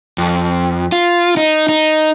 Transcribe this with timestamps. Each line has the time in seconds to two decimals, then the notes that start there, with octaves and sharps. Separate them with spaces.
0.18 F2
0.92 F4
1.37 D#4
1.69 D#4